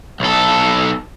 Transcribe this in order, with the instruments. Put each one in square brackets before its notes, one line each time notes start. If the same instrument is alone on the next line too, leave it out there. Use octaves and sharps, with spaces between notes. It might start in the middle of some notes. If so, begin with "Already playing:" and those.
[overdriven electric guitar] B1 A4